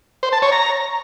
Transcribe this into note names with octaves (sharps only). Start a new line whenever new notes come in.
C5
A5
C#5
A#5